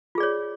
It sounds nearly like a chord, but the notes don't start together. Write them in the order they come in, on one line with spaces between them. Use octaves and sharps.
F4 G#4 D5 C#5